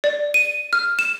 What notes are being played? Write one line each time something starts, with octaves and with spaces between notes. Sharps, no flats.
D5
D#7
F6
E7